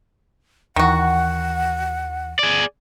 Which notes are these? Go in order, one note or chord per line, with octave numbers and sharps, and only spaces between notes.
D#2 D#3 E3 F#4 F#5
G#4 D5